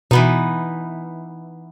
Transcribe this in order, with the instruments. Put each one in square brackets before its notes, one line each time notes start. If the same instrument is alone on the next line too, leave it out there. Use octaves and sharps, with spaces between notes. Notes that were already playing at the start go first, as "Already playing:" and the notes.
[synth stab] B2 [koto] E3 B3 D#4